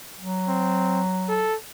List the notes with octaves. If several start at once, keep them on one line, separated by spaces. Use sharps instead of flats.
F#3
C4
A4